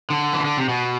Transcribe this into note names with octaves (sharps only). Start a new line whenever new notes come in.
D3
E3
D3
C3
B2